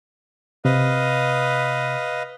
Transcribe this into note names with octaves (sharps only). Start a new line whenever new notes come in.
C3 B4 D#5 F5